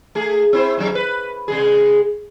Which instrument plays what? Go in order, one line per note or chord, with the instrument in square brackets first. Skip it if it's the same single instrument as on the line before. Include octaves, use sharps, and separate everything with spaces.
[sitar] A3 G#4
C4 E4 C5
G#2 C#3 F#3
B4
C3 G#3 G#4